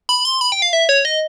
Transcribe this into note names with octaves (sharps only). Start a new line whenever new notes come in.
B5
C6
B5
G5
F5
E5
C#5
D#5